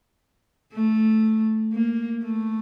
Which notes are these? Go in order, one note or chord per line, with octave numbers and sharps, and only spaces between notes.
A3
A#3
A3